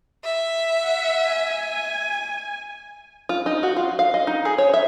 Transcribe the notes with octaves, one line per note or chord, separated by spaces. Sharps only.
E5
F#5
G#5
F4
D#4
F#4
F4
F5
D#5
D#4
G#4
C#5
E5